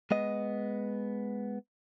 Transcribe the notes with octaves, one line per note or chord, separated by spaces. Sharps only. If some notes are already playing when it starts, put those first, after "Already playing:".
G#3 B3 D#5